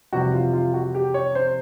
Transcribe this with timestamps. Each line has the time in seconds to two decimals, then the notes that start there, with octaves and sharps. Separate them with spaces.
0.13 F2 C3 E3 G3 F#4
0.33 F4
0.53 F4
0.74 F#4
0.95 G4
1.14 C#5
1.35 C5